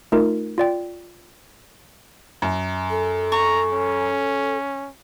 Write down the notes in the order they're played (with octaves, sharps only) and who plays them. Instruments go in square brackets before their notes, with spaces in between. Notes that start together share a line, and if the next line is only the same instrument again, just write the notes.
[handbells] A3 D#4 F4 A#4
F4 D5 G5
[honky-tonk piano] F#2
[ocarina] A4
[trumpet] A#5 [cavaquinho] C#6
[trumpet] C#4